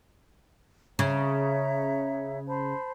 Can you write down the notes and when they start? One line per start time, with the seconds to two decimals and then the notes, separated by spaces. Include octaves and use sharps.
0.99 C#3 C#5 E5 A#5
2.47 C5 A5 B5